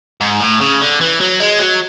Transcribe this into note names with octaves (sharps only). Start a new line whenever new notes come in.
G#2
A2
C#3
D3
E3
F#3
G#3
F#3